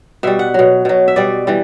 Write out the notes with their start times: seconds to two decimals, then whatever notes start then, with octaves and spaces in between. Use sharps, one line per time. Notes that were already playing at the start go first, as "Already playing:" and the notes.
0.23 B2 G3 E5
0.39 F#5
0.54 B2 F#3
0.85 B2 F#3
1.08 E5
1.16 B2 G3 D5
1.47 E3 G3